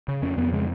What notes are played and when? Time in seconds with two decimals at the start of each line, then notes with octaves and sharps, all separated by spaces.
0.08 C#3
0.22 F2 C#4
0.37 F2 B3
0.52 C#3 G#3